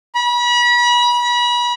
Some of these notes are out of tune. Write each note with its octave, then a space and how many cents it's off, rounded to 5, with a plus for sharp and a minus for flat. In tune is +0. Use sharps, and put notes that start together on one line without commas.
B5 -35